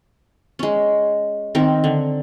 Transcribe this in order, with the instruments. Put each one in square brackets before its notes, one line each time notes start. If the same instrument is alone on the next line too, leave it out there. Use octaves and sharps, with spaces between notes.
[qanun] G#3 C#4
D#3 C4 A#4
D3